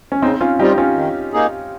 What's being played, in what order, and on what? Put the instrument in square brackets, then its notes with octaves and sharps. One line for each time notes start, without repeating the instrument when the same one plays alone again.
[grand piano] C#4
[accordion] C#3 [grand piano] C4 D#4
[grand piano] C#4 F4
[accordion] G3 C4 F4 [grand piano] D#4 G4
[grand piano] C#4 F4
[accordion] D#3
A#3 D#4 G#4